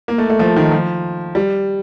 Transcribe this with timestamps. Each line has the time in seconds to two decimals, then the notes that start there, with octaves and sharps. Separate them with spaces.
0.08 A#3
0.18 A3
0.30 A3
0.39 F3
0.56 D#3
0.71 F3
1.35 G3